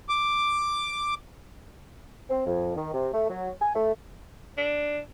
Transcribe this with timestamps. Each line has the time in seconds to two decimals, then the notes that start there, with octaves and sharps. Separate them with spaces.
0.09 D6
2.30 C4
2.47 F2
2.76 D#3
2.94 C3
3.14 A3
3.29 F#3
3.61 G#5
3.76 A3
4.58 D4